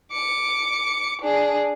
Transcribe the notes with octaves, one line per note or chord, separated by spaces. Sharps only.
D6 C#7
D4 G#4